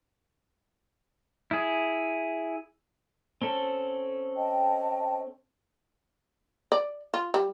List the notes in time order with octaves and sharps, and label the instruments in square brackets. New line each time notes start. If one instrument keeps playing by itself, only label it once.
[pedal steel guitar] E4 G#4
C4 C#4 A4
[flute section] D#5 G5 A5
[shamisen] D5
F4
G3